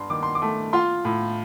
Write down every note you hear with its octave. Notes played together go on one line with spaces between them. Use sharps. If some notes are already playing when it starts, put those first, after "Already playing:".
Already playing: G2 C6
D#3 D6
C6
D6
A3
F4 C6
A2